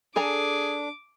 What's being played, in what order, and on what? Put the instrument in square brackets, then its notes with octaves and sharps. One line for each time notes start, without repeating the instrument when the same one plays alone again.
[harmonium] D4 [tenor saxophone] G#4 [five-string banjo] A4 G#5 A#5 [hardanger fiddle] D6